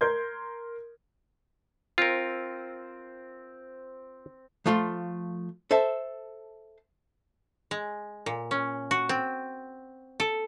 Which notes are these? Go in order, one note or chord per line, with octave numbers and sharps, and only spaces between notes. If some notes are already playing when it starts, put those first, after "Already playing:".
A#4 C6 G6 G#6
C4 F4 A#4
F3 A3 F4 C6
A4 C5 E5 A5
G#3
A#2
C#4
F#4
C4
A4